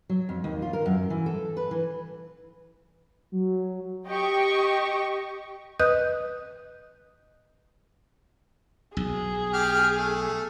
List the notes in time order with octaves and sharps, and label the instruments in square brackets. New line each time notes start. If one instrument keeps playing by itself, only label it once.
[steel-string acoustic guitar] F#3
F2
D#2
F4
A#4
F#2
E3
A4
B4
E3
[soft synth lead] F#3
[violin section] G4 D#5 G5 C#6
[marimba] B4 D#5 D#6 F#6 G6
[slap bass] B1 [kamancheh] G#4
[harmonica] G4 F6
A3